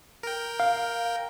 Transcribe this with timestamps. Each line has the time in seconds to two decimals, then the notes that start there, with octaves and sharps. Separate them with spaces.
0.23 A#4 G5
0.60 F5